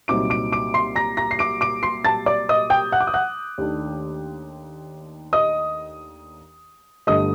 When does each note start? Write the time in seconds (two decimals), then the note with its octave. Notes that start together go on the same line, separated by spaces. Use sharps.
0.08 C2 A#2 F#3 C4 D#4 D6 D7
0.30 D6 D7
0.52 D6 D7
0.74 C6 C7
0.96 A#5 A#6
1.17 A#5 A#6
1.31 C7
1.39 D6 D7
1.61 D6 D7
1.83 C6 C7
2.05 A5 A6
2.26 D5 D6
2.49 D#5 D#6
2.70 G5 G6
2.92 F#5 F#6
3.01 D6
3.07 D#6
3.14 F#5 F#6
3.58 D#2 D#3 A3 D4
5.33 D#5 D#6
7.07 G1 G2 D3 A3 D#5 D#6